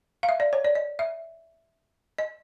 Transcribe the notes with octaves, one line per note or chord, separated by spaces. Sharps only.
F5
E5
D5
C#5
D5
D#5
E5
D#5